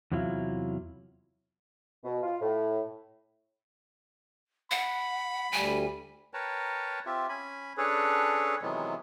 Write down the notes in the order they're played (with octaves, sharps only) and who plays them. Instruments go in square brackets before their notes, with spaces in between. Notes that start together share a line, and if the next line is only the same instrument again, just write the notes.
[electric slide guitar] E2 C3 F#3 E4 F4
[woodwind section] B2
F4
A2
[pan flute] F#5 [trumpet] B5
[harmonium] D2 G3 [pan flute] G#5
[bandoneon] A#4 B4 C#5 G5 A5 A#5
C4 F4 G4 E5
C#4 G#5 B5
C#4 D4 G#4 A4 B4 C#5
C3 D#3 E3 F#3 G#3 B3